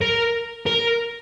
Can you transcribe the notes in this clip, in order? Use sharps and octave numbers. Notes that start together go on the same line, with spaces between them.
A#4
A#4